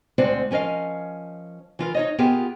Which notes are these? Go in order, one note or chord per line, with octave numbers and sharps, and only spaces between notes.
D2 G#3 C4 C5 D5 F#5
F3 C#4 A#4 D#5 F5
E3 F4 A#4
D#4 C#5 D#5
B3 F4 G4 G#4 A#4